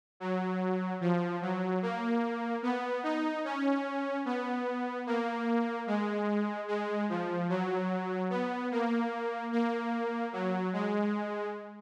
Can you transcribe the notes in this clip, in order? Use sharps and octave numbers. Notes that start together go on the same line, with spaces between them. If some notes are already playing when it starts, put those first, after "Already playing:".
F#3
F3
F#3
A#3
B3
D#4
C#4
B3
A#3
G#3
G#3
F3
F#3
B3
A#3
A#3
F#3
G#3